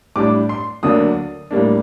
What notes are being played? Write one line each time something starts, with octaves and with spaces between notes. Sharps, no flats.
A2 G3 D4 D6
C6
D2 D3 F#3 A#3 D4 D#6
A2 G3 A#3 D4